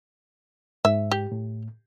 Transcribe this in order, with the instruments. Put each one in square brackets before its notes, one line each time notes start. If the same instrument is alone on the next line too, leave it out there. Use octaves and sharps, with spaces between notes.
[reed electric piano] G#2 [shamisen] E5
[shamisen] G4
[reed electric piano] A2